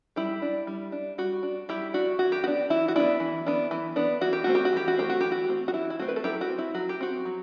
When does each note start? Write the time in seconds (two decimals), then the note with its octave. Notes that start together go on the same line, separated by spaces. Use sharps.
0.16 G3 E4 G4
0.42 D4
0.67 G3
0.92 D4
1.18 G3 F#4
1.43 D4
1.69 G3 E4 G4
1.94 D4 F#4
2.19 E3 F#4
2.32 G4
2.44 B3 D4 F#4
2.70 E3 E4
2.88 F#4
2.96 B3 D4 E4
3.20 E3
3.46 B3 D4
3.71 E3
3.96 B3 D4
4.21 E3 F#4
4.33 G4
4.44 A3 C4 F#4
4.55 G4
4.65 F#4
4.73 E3 G4
4.88 F#4
4.97 A3 C4 G4
5.10 F#4
5.21 E3 G4
5.32 F#4
5.48 A3 C4
5.68 F#4
5.74 E3 E4
5.90 E4
5.99 A3 C4 F#4
6.08 B4
6.16 A4
6.24 F#3 E4 G4
6.41 F#4
6.50 C4
6.58 E4
6.74 F#3 F#4
6.89 G4
7.01 C4 F#4
7.25 F#3